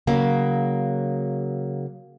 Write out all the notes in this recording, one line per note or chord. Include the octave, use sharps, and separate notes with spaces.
C#3 F#3 A#3